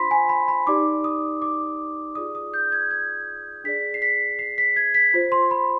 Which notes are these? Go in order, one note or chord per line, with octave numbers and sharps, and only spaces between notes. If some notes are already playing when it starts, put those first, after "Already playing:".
Already playing: D4 F4 C5 B5 C6 B6
G#5
B5
B5
D#4 G4 D5 D6
D#6
D6
F4 G#4 D5 D#6
D#6
G6
G#6
G#6
D4 G#4 D5 B6
C7
B6
C7
B6
G#6
B6
F4 C5
C6
B5